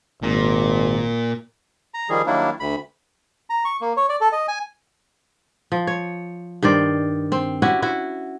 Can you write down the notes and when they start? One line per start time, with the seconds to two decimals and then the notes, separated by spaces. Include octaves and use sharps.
0.23 G#1 A#2
1.94 A#5
2.10 D#3 F3 G3 G#4
2.26 D#3 F#3 G3 A#3 D4 E4
2.60 D2 B5
3.50 A#5
3.65 C#6
3.81 A#3
3.97 C#5
4.09 D5
4.21 A4
4.32 D#5
4.48 G#5
5.72 F3
5.87 C#5
6.63 G2 D#3 C5 D5
7.32 C4
7.62 C#4 E4 F#4 G4
7.82 E4 F#4